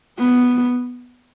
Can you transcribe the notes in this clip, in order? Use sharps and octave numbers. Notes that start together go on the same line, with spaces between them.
B3